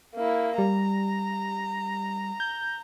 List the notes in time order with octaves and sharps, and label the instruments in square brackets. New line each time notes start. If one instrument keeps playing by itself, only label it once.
[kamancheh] A#3 E4
[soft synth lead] G3 [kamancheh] A#5
[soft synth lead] G6